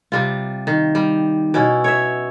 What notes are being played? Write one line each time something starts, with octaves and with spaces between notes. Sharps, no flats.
C3 G3 F4
D#3
G3
B2 C#4 E4
C#5 E5